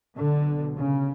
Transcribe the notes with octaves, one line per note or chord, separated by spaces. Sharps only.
B1 B2 D3
C#3